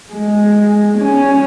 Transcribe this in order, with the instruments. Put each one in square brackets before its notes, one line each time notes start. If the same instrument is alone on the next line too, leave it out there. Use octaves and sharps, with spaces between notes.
[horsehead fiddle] G#3
C#4